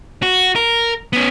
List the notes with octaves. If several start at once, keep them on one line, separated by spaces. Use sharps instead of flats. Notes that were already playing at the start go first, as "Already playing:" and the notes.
F#4
A#4
B3 C#4